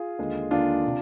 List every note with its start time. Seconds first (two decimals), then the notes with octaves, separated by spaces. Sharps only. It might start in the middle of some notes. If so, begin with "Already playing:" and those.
Already playing: F4 G#4
0.18 D#2 D3 G#3
0.51 D#2 D3 G#3 D4 F4
0.86 C3